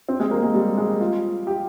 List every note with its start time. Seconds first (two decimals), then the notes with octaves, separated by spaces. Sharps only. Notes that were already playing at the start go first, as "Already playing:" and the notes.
0.09 C4
0.20 G#3
0.31 A#3
0.43 G#3
0.54 G3
0.78 G#3
1.00 F4
1.47 G4